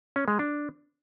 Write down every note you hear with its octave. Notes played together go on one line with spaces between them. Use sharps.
C#4
G#3
D4